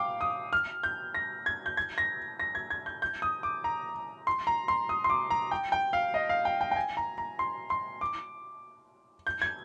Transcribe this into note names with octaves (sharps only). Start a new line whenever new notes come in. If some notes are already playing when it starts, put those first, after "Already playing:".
Already playing: F5 G5 D6
D#6
F6
G6
A#6
G#6
G6
G#6
A#6
A#6
G#6
G#6
G6
G6
D#6
D6
A#5
C6
A#5
C6
D#6
C6
D6
A#5
G5
G5
F5
D#5
F5
G5
G5
G5
G#5
A#5
A#5
C6
C6
D6
G6
G#6